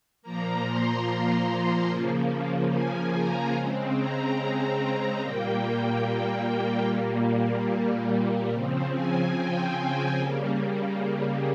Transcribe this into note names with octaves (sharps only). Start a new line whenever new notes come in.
A#2 F3 A#3 A#5
C6
A#5
C#3 F3 A#3
G#5
A#5
C#3 G#3 C4
A#5
A#2 G3 A#3 G5
A#2 G3 A#3
C#3 F3 C4
G#5
G5
C#3 G3 A#3